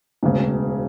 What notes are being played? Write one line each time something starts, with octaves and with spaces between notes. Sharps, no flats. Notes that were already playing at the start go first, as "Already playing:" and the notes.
E1 D2 C#3